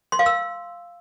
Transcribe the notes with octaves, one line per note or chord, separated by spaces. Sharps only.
C6
F5
E6